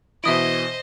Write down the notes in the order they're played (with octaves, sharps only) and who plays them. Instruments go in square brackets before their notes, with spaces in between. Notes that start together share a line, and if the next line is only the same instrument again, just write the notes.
[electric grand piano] B2 E3 E4 [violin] C5 D#5 [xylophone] E5 D#6 D7